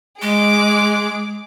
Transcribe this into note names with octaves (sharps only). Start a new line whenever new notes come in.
G#3 G#4 D6